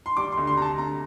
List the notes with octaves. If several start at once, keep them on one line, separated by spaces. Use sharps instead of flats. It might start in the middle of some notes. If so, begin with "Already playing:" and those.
C6
G3 D6
C6
D2
C6
C3 A5 A#5
D2 A#5